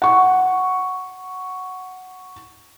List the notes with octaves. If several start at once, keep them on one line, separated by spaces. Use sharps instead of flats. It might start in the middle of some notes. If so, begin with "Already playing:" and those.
F#5 C#6